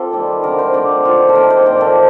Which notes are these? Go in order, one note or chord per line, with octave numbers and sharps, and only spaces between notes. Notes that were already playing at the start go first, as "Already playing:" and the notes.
Already playing: C4 F4 G4 A4
D#3 G3 A#3
D3 A3 C4 A#4
C5
D3 A3 C4 D5
D#3 A#3 F4
A4
D#3 A#3 A#4
C5
A#2 F3 A#3 A#4
A4